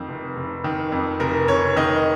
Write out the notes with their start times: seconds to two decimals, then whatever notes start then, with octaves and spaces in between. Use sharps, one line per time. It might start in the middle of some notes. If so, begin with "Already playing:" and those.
Already playing: F2 D#3
0.08 F1
0.36 F1
0.64 D#3
0.92 F2
1.20 F1 A#4
1.48 F1 C#5
1.76 D#3 D#5